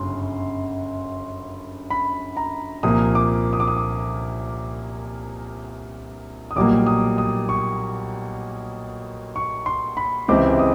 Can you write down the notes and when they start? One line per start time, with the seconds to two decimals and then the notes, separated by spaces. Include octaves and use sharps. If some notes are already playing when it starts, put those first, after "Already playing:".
Already playing: G1 F#2 C#3 C6
1.90 B5
2.37 A#5
2.83 C2 A#2 F3 A#3 D#6
3.15 D6
3.53 D#6
3.60 D6
3.67 D#6
3.77 D6
6.51 D#6
6.56 B1 A#2 G3 A#3 D6
6.86 D#6
7.18 D#6
7.49 C#6
9.36 C#6
9.66 C6
9.97 B5
10.28 C#2 C3 E3 G#3 C4 D6
10.59 D#6